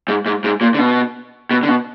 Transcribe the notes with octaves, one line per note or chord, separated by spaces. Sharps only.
G#2
G#2
G#2
A#2
D3
B2
B2
D3
B2